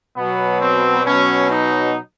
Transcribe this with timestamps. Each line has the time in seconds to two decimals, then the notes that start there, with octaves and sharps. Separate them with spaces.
0.16 B2 F#3 B3
0.61 C4
1.06 B2 F#3 C#4
1.50 D#4